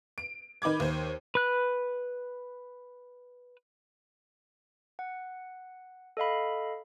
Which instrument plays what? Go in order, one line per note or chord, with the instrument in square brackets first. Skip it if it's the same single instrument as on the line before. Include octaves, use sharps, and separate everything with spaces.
[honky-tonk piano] D7
D#3 D#4 B5 D6 G#6
D#2 C5
[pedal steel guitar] B4 F#6
[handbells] F#5
A4 D#5 F5 B5